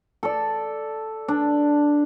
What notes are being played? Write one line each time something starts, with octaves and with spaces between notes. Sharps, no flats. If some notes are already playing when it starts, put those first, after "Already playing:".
A4 D5
D4